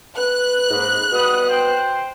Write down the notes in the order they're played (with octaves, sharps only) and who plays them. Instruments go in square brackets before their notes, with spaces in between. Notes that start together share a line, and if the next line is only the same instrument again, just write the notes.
[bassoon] B4 [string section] F#6
[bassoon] G#2 [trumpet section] A#3 D#5 B5
[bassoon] B2 [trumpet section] G3 B3 D#6
[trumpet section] C5 G5